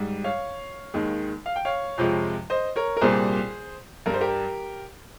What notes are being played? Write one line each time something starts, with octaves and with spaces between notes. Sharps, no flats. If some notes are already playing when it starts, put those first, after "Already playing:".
Already playing: G#2 G3
C#5 F5
D#2 D#3 G#3
F5
G5
C#5 F5
F2 C3 F3 G#3
C5 D#5
A#4 C#5
A#4
C2 A#2 G3 G#4 C5
G2 G3 A#4 C5
G4 A#4